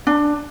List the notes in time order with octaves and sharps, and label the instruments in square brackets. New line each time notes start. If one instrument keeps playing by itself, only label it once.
[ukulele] D4